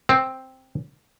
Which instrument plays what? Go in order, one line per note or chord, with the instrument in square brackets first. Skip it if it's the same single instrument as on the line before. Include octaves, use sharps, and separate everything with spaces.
[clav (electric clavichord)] C4